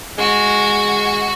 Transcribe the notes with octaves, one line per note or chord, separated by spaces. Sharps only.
G#3 F#4